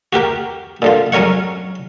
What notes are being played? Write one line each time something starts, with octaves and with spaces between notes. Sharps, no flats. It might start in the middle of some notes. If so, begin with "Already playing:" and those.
F#4 G4 A#4 G5
A#2 D3 F4
F#3 C#4 A#4 C#5 F#5